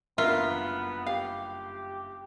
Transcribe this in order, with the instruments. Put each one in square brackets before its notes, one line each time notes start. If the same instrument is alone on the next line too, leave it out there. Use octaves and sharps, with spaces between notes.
[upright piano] F#1 G2 E5 [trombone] B3 [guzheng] F4 [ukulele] A#4
[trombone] G4 [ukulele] F5